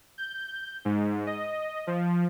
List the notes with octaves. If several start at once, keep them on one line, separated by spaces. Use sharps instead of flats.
G6
G#2
D#5
F3